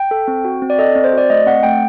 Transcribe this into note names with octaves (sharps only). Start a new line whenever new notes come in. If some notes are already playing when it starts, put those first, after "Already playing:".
Already playing: G5
A4
C4
F#4
C4
D5
A4 D#5
C4
C5
F#4 D5
A3 D#5
C4 F#5
A3 G5